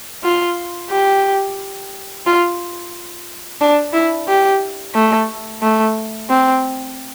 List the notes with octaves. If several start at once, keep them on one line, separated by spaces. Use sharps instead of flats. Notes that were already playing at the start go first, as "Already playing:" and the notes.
F4
G4
F4
D4
E4
G4
A3
A3
C4